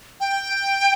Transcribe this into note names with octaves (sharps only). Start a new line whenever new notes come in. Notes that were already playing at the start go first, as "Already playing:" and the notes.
G5